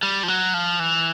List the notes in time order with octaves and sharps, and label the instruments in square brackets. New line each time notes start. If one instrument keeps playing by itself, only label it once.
[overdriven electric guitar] G3
F3
F#3
F3
E3